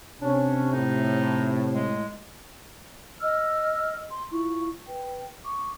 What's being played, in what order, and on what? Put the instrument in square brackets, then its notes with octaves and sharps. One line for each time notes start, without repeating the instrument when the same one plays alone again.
[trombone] C3 [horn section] C#4 [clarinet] D4
[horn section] A2 [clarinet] D#4
[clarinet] G#3
[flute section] D#5 E6 F6
C6
E4 F4 C#6
B4 G5
C#6 D6